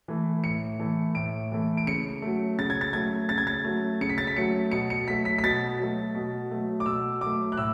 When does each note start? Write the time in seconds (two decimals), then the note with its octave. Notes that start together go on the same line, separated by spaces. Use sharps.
0.08 E3 A3
0.44 A2 C#7
0.79 E3 A3
1.15 A2 D7
1.52 E3 A3
1.77 D7
1.87 C#3 C#7
2.22 F#3 A3
2.59 C#3 A6
2.70 G#6
2.81 A6
2.93 F#3 A3 G#6
3.29 C#3 A6
3.38 G#6
3.47 A6
3.65 F#3 A3
4.01 C#3 C#7
4.09 B6
4.18 A6
4.27 B6
4.37 F#3 A3 C#7
4.72 B2 C#7
4.90 C#7
5.07 F#3 A3 B6
5.25 B6
5.38 B6
5.44 B2 A6
5.79 F#3 A3
6.15 B2
6.51 F#3 A3
6.80 D6
6.86 B2 E6
7.21 F#3 A3 D6
7.52 F#6
7.57 A2 E6